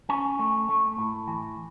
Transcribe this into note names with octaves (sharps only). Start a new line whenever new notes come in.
C#4 G#5
A3
A3
A2
E3